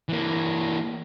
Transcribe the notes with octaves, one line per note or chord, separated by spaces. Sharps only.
E3 A#3